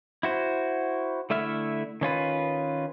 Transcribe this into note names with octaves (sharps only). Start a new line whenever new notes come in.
E4 F#4 C5
D3 A3 E4 E5 F6
D#3 C#4 F4 B4